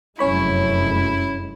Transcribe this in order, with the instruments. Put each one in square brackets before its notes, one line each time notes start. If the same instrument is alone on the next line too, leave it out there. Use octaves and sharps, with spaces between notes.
[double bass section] F1 F#2 G#3 [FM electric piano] C#4 C#5 B5 [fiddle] E4